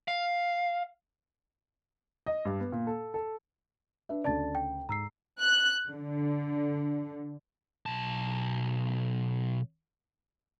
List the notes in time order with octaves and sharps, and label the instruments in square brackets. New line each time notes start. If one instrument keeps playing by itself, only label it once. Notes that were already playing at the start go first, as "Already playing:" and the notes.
[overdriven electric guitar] F5
[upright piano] D#5
G2
B3
A#2
A4
A4
[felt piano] D4 B4 E5
[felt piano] D2 C#3 [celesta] D5 A5 A6
[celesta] G5
[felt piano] G#2 [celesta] A#5 E6 C7
[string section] F#6
D3
[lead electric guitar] B1 A5